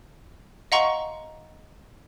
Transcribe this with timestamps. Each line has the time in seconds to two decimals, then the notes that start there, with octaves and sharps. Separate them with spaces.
0.72 D#5 F5 F#5 A#5 C6 C#6